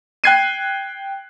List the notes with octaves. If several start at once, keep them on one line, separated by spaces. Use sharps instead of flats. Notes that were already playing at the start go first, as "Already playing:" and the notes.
G5 F#6 G#6 C7 D#7